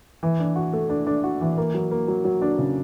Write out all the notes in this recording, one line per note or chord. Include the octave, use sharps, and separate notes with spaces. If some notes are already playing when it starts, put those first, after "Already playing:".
E3
D4
F#4
A3
D4
D4
F#4
E3
A#3
F#3
A#3
F#3
F#3
D4
C#3